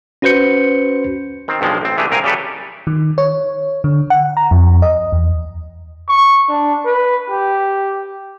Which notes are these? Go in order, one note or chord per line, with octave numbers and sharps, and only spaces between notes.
C#4 F#4 B4 C5 G6 C#7
D#3 C4
B1 G2 F3 G#3
A1 C4
E3 A3 D4 G4 G#4
C2 C4 A#4 F5 G#5
C#3 G3 G4 A4 B4
D#3
C#5
D3
F#5
A#5
F2
D#5
E2
C#6
D4
B4
G4